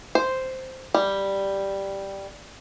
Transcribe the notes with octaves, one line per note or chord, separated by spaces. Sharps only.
C5
G3